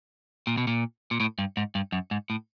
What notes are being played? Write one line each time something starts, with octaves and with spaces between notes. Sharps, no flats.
A#2
B2
A#2
A#2
A2
G2
G#2
G2
F#2
G#2
A2